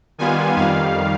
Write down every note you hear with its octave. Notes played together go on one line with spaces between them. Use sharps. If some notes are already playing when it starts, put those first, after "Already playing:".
D#3 G3 B3 F4 G#5
F2 D#3 G3 F5